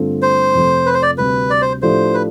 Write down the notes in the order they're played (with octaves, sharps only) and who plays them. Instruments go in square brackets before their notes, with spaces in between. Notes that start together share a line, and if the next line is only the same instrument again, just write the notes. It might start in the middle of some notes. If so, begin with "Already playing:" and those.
Already playing: [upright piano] G2 D3 A3 C4 F4
[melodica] C5
[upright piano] F2 C3 F3 A3
[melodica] B4
C5
D5
[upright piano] D2 C3 G3 [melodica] B4
[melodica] D5
C5
[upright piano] A2 F3 A3 D4 G4 [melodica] C5
[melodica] B4